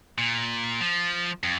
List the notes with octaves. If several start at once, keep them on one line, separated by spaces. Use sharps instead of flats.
A#2
F3
F2